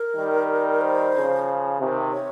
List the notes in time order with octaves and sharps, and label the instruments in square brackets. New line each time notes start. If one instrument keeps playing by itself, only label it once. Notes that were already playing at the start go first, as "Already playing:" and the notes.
Already playing: [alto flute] A#4
[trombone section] D#3 G3
[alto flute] C5
[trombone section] C#3 F3
C3 D#3
[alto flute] C#5